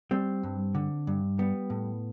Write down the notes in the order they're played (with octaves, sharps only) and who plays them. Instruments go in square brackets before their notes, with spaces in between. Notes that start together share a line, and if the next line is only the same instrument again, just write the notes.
[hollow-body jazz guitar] G3 C4
G2
D3
G2
G3 B3
A2